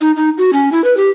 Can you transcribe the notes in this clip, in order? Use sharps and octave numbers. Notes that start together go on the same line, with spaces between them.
D#4
D#4
F#4
C#4
E4
B4
G4